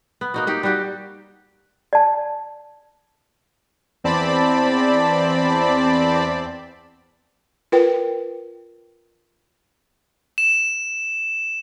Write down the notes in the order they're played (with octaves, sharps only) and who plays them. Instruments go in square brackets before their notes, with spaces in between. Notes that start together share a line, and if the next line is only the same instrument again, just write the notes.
[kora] B3
A#3 D#4 F#4
A#3 D#4 G4
G3 D#4 F#4 G4
[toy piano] D5 A5
[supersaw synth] E2 C4 D5 A5 B5
[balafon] F4 A#4 B4 G5
[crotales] E7